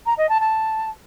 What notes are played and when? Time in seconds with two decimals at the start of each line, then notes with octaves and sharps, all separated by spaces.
0.06 A#5
0.17 D#5
0.29 A5
0.40 A5